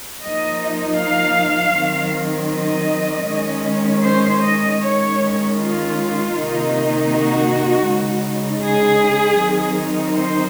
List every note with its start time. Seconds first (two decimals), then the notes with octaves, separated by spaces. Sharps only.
0.21 F3 A#3 D#4 D#5
0.98 F5
1.74 D#3 F#3 C4
2.51 D#5
3.27 D#3 G#3 C#4
4.04 C5
4.42 D#5
4.81 D#3 G#3 C#4 C#5
5.57 F4
6.33 C3 D#3 A#3 D#4
7.10 F#4
7.86 C#3 G#3 D#4
8.63 G#4
9.40 D#3 F#3 C4 D#4
10.16 C5